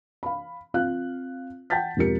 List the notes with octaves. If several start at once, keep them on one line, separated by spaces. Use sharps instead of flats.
F5 B5
C4 F4 F5 F#6
F#5 G5 A5 G6 A6 B6
E1 F3 C4 G4 A#4 C#7